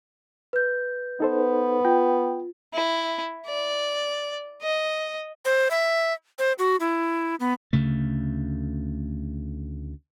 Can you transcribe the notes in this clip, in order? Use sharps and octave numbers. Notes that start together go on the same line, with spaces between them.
B4 G6
B3 D#4 A4 C5
F4 G5
E4
D5
D#5
C5
E5
C5
F#4
E4
B3
D2 C#3 A3